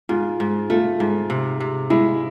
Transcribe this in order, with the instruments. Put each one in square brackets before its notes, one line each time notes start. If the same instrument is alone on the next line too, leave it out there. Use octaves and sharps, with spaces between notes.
[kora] G#2 [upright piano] F4
[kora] G#2
[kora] A3 [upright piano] F4
[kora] G#2
C3
C3
[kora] G#3 [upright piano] E4